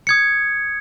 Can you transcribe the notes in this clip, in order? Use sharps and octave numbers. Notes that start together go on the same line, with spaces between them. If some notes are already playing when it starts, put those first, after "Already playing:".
D#6 G#6 C#7